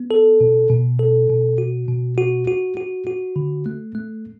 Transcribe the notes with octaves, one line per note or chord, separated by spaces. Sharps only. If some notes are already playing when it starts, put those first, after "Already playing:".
Already playing: B3
A4
B2
B2
A4
B2
F#4
B2
F#4
F#4
F#4
F#4
D3
A3
A3